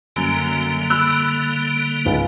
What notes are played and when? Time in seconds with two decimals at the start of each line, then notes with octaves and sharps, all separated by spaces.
0.16 F#2 D3 G3 A#3
0.90 B5 E6 F#6
2.05 C#2 G#2